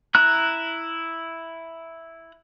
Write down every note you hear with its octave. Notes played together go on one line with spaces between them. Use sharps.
E4 A#5 F#6